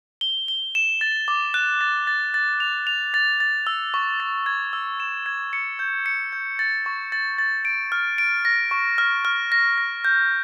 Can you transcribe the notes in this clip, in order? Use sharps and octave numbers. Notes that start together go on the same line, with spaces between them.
G7
G7
E7
A6
D6
F#6
A6
A6
A6
F7
F7
A6
A6
E6
C#6
A6
G#6
E6
E7
G#6
C#7
G6
C#7
G6
A6
C#6
A6
A6
D7
F6
D7
A#6
C#6
F6
F6
A#6
A#6
G6